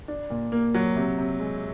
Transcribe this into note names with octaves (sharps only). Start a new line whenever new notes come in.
D4
A#2
A#3
F#3
C3
C3
G#3